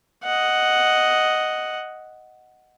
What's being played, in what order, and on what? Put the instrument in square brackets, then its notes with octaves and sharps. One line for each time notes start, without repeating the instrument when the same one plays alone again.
[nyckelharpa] D#5 F#5